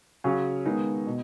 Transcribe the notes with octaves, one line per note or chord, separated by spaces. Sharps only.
C#3 F#3 C#4 G#4
D#3 G#3 B3 D#4
B2